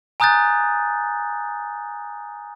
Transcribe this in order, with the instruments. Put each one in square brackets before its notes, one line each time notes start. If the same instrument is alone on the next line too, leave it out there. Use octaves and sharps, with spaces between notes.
[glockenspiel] G#5 A#5 D#6 F#6 G6 A6